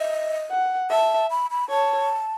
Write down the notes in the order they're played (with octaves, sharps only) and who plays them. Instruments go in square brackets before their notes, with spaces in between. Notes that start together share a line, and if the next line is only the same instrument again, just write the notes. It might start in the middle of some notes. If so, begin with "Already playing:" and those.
Already playing: [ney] D#5 [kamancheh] E5
[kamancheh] F#5
[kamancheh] E5 [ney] A5
[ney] B5
B5
[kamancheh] C#5 [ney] A5